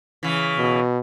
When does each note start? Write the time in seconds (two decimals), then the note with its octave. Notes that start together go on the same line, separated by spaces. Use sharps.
0.23 C#3 E3
0.58 B2